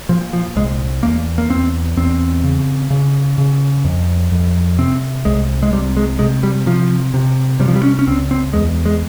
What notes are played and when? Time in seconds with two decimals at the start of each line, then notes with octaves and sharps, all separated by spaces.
0.09 A#2 F3
0.33 F3
0.56 C2 G#3
1.03 E2 A#3
1.38 A#3
1.50 E2 C4
1.97 E2 C4
2.44 C#3
2.90 C#3
3.38 C#3
3.85 F2
4.31 F2
4.78 C3 C4
5.25 C2 G#3
5.63 G#3
5.73 C3 G3
5.97 G#3
6.19 C3 G#3
6.43 G3
6.66 C3 F3
7.14 C3
7.59 C3 G3
7.68 F3
7.76 G3
7.83 C#4
7.99 C#4
8.07 C#2 C4
8.31 C4
8.53 E2 G#3
8.85 G#3